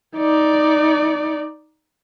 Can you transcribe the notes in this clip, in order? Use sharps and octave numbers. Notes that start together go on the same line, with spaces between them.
D#4 D5